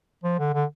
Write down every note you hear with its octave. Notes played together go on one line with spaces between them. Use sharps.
F3
D3
D3